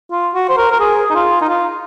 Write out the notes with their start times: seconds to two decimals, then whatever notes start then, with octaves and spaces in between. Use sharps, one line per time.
0.11 F4
0.35 F#4
0.49 C5
0.57 A#4
0.72 A#4
0.80 G#4
1.11 D#4
1.15 F4
1.41 D#4
1.49 F4